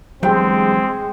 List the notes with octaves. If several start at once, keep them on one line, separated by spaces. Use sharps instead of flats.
E2 G2 F#3 G#3 C4 G5